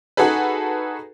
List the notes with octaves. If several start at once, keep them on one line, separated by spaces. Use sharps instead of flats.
D#4 F#4 G#4 A4 B4